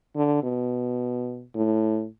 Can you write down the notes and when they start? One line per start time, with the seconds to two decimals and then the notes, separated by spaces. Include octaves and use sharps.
0.16 D3
0.43 B2
1.55 A2